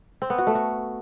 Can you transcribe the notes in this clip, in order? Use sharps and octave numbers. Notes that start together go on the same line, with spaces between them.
C4
B3
F#4
A3
F#4